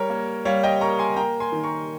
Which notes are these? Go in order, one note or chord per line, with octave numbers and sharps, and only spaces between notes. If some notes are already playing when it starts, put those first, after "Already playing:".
Already playing: G3 A#4 C#5
A#3
G3 C#5 F5
D#5 G5
A#3 A#5 C#6
G#5 C6
A#3 G5 A#5
G#5 C6
D#3
A#5 C#6